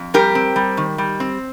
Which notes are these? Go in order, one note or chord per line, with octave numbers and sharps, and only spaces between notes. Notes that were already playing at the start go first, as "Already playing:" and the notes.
Already playing: F2
G3 G4 A#4
C4
G3
D#3
G3
C4